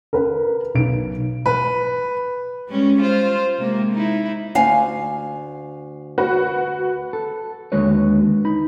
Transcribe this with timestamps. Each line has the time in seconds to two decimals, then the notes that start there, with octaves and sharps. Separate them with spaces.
0.13 A#4 B4
0.74 B1 D7
1.46 B4
2.68 G3 G#3 C#4
3.02 F4 C5
3.58 C3 G#3 A#3
3.93 D#4 E4
4.55 D2 F5 G#5
6.18 F#4 B4
7.13 A4
7.72 D#2 D3 G#3 F#4 B4 C#5
8.45 D#4 B5